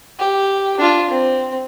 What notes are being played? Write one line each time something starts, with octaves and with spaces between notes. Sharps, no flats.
G4
D4 F4
C4